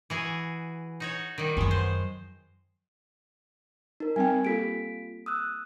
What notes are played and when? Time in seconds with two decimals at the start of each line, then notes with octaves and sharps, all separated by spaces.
0.10 E3 F#4 G#4
1.00 D#4 F#4 C#5
1.38 D#3 G3
1.57 F#2 F#3 G#3 B3
1.71 C5
4.00 D#4 A#4
4.16 G3 C4 G5 G#5
4.45 A#3 F4 G4 A4 B6 D7
5.26 D#6 E6 F#6